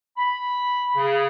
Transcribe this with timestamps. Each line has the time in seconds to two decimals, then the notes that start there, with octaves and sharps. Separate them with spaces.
0.17 B5
0.96 C#3